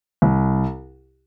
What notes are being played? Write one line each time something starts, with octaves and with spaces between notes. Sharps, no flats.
C2